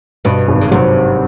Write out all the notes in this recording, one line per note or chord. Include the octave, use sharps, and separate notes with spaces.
G2 B2
G#1
C#3
C3 F#3